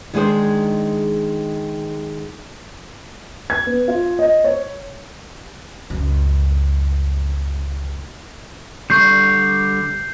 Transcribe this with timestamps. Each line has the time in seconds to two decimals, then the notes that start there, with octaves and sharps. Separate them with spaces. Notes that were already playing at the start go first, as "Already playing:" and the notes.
0.14 D#3 G#3 D4 G#4 C5
3.50 G#6
3.67 B3
3.88 F4
4.19 D#5
4.44 C#5
5.90 C#2 F#2
8.90 D3 G3 C#6 G6 C7